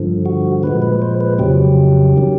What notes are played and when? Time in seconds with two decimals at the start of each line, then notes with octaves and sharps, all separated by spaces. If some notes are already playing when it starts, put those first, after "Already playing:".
Already playing: G2 D3 F3
0.26 F#4
0.63 A#2 F3 G#3 B4
0.82 B4
1.02 C5
1.21 B4
1.38 F2 C#3 F#3 G4
2.16 D#3 F#3